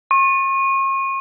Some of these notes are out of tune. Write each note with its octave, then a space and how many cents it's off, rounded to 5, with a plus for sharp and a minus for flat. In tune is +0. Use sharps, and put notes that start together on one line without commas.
C#6 -45